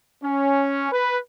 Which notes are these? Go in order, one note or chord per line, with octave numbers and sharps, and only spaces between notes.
C#4
B4